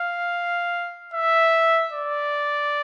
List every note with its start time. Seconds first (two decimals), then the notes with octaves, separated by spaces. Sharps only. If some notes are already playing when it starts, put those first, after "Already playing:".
Already playing: F5
1.14 E5
1.92 D5